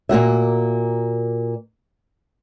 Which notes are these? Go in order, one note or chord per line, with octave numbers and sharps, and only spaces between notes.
A#2 A#3 F#4 E5